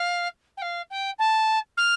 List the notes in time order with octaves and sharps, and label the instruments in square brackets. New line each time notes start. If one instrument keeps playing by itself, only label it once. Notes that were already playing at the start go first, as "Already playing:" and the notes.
Already playing: [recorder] F5
G5
F5
G5
A5
F6